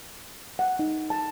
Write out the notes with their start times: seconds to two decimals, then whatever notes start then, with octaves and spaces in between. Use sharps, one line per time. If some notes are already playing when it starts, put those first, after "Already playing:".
0.59 F#5
0.79 D#4
1.10 A5